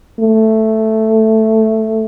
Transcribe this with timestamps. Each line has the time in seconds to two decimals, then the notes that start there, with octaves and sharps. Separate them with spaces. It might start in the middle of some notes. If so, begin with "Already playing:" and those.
0.19 A3